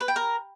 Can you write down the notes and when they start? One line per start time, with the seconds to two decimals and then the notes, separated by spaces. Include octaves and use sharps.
0.01 B4
0.08 G5
0.16 A#4